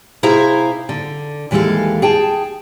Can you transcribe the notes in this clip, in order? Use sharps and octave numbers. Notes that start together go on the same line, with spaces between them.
C3 E4 G#4 C5 F5 A#5
D3
D#2 E3 G#3 G4 A4 F5
G#4 G5 A5